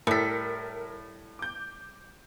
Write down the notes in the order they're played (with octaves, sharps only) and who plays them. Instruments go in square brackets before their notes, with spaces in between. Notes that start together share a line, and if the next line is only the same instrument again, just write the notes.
[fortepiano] A2 [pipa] G3 A4 [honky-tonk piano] A#4 B6
[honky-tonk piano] D6 G6